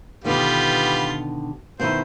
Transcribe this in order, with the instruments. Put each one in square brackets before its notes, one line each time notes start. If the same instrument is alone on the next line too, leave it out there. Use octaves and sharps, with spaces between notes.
[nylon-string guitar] B2 D3 D#3 [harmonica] G3 B3 F4
[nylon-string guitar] B2 D#3 E4 [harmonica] C5